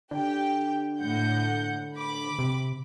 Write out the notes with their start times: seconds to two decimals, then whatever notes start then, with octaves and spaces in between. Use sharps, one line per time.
0.11 D3 G4 G5
1.01 A2 F#5 G6
1.96 B5 D6
2.39 C3